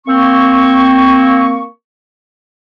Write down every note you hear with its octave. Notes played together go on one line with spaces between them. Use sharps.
A#3 C4 C#6